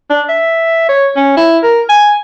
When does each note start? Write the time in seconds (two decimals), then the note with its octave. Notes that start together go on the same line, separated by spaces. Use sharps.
0.10 D4
0.29 E5
0.89 C#5
1.17 C#4
1.37 E4
1.64 A#4
1.89 G#5